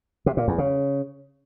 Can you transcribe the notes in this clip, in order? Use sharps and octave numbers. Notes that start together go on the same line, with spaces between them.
C3
A#2
E2
C#3